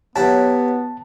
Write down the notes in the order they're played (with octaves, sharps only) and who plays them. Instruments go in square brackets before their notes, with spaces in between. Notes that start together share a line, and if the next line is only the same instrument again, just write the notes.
[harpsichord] F#3 E4 G4 [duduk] B3 [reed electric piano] A5